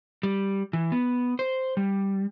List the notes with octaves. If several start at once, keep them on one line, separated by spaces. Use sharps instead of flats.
G3
E3
B3
C5
G3